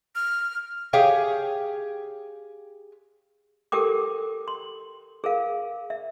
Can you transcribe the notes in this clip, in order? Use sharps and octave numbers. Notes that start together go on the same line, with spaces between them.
F6
G4 G#4 C#5 F5 G5 G#5
G4 A4 A#4 G5 D6
C6
G#4 A#4 F5
E5